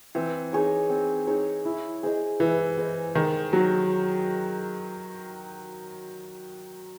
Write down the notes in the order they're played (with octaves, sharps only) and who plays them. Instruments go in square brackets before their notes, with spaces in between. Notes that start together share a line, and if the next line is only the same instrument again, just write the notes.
[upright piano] E3 [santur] C4
[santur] D#4 G#4 C#5
C4
D#4 G#4 C#5
E4
G#4 C5 D#5
[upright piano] E3 [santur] E4
[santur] G#4 C5 D#5
[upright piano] D#3 [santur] G#3
[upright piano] F#3 [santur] D#4 F#4 C#5